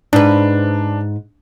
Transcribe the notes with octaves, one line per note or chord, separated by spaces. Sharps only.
G#2 D4 B4